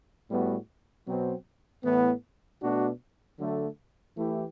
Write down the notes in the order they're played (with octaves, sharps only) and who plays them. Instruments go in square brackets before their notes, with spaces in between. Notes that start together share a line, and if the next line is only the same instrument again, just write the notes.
[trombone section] A2 G3 B3 F#4
B2 F#3 C4
A2 E3 B3
B2 A3 D4 F#4
D3 F#3 A3
E3 A3 E4 G4